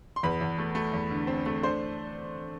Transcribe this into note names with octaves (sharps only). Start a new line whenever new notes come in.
C6
E2 B4 B5
E2
A3
A3
E2
D3
C4
A3
D4 C5 C6